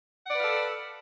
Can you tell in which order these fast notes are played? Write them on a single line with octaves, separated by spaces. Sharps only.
F#5 D5 B4 F5 A4